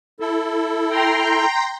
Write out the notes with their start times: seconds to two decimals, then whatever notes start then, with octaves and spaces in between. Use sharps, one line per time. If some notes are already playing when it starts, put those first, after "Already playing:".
0.20 E4 A4
0.88 G5 A#5 C6